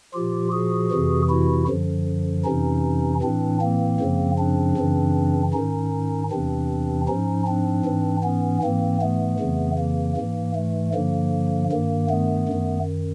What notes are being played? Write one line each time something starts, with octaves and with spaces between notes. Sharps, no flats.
A#2 F3 F4 G4
F#4 G#4
F2 C3 E3
E4 F#4
F#2 D3 F3
F2 C3 E3 C#4 D#4
A2 E3 C4 D4
A#3 C4
F#2 C#3 F3
C4 D4
F#2 C#3 E3
G#2 D#3 C#4 D#4
E2 C3 E3 C4 D4
G#2 F3 C#4 D#4
C4 D4
G#2 E3
B3 C#4
G#2 E3 A#3 C4
A3 B3
F2 C#3 E3
A#3
G#2 E3 A#3
A3
G2 D3 F3 A#3
G2 D#3 A#3
A3 B3
F#2 D#3